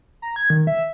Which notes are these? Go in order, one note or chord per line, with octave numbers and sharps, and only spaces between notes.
A#5
G#6
D#3
E5